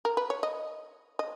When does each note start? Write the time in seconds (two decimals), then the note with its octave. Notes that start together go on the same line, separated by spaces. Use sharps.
0.05 A#4
0.17 B4
0.30 C#5
0.43 D#5
1.19 D#5